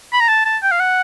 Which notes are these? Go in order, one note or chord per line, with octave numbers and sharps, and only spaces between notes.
B5
A#5
A5
A5
G5
F5
F#5